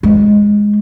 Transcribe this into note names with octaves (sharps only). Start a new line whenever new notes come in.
G#3